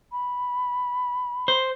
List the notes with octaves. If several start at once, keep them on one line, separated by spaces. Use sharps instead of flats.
B5
C5